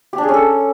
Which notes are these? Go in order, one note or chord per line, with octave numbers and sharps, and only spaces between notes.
G4
D4
G#4
C#4
A4